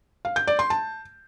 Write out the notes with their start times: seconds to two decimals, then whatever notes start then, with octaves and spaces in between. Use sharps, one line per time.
0.25 F5
0.36 G6
0.47 D5
0.59 C6
0.70 A5